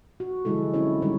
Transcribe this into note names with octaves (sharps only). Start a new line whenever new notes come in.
F#4
D3 F3 F#3 G#3 E4 A4
C4 C#4 E4 C#5
D#3 G3 G#3 D#4 C#5